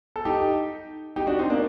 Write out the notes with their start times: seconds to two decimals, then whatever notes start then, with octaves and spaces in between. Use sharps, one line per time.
0.16 A4
0.25 D#4 G4
1.16 D#4 G4
1.27 D4 F#4
1.39 C4 D#4
1.50 A#3 D4